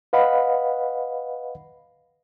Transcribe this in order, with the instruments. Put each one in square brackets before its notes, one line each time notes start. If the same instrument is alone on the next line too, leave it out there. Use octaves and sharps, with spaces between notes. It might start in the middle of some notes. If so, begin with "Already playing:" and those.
[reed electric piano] B4 D#5 F5 F#5 B5